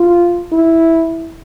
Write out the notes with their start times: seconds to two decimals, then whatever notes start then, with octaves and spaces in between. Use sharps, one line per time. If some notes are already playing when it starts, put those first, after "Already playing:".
Already playing: F4
0.52 E4